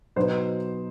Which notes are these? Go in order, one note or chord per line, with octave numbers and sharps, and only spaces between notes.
B2 F#3 B3 D#4 C5